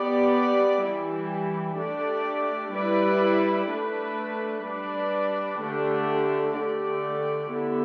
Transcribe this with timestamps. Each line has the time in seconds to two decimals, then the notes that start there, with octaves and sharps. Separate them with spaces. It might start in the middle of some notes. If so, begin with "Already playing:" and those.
Already playing: B3 G4 D5
0.81 E3 G3 E4 G4
1.78 A3 D4 G4 D5
2.73 G3 E4 B4 D5
3.68 A3 D4 B4
4.65 G3 D4 B4 D5
5.60 D3 A3 D4 G4
6.57 D3 A3 G4 D5
7.52 D3 B3 E4 G4